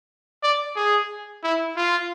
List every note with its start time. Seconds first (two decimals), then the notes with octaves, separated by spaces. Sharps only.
0.43 D5
0.76 G#4
1.44 E4
1.77 F4